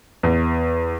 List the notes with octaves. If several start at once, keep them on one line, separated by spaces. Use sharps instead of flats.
E2